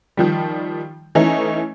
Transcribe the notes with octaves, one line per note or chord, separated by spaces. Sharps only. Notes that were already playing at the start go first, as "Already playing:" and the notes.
D#3 F3 G3
E3 A3 C#4 D#4